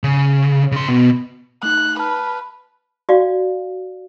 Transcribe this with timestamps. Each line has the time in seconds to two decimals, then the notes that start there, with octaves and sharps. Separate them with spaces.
0.04 C#3
0.72 C#3 C6
0.88 B2
1.63 A3 D#4 F#6
1.99 B4 A5 F6
3.09 F#4 D5 F5